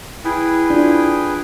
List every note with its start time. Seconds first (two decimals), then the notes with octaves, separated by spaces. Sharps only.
0.24 E4 G#4 B4 G5
0.70 D4 F4